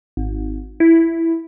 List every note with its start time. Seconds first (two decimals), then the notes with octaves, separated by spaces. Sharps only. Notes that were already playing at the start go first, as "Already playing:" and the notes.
0.17 G#1
0.80 E4